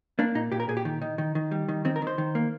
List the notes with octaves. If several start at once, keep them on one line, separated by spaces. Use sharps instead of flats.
A#3 D4
A#2 D#4
A#2 G4
A#4
A#2 G#4
G4
D#3
D#3
D#3
D#3
G3
D#3
D#3 C4
A#4
D#3
C5
D#3
A#3